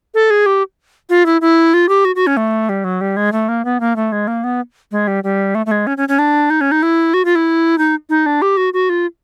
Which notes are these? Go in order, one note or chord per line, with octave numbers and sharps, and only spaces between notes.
A4
G#4
G4
F4
E4
E4
F4
G4
F#4
F#4
C#4
A3
G3
F#3
G3
G#3
A3
A#3
B3
A#3
A3
G#3
A#3
B3
G#3
G3
G3
A3
A3
G#3
C#4
C#4
C#4
D4
D#4
C#4
D#4
E4
F#4
F4
E4
D#4
D#4
D4
G4
F#4
F#4
F4